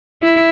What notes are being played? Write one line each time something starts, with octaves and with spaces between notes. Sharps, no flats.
E4